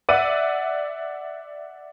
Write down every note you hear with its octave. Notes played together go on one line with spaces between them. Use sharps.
D5 E5 F#5 D#7